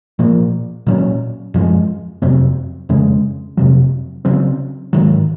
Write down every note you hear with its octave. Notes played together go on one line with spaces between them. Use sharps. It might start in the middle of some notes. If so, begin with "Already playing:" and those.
A#2 F3 A#3
A#2 F#3 C#4
F#2 F3 G#3
F2 C3 F#3 C4
F2 C#3 G#3
F2 C3 F#3
C#3 F#3 C4
G#2 D#3 F#3